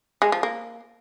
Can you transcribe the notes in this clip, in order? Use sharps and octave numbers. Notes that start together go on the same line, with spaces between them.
G#3
F3
A#3